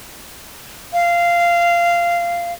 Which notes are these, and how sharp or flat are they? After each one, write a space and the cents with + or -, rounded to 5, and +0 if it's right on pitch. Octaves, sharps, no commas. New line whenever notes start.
F5 -15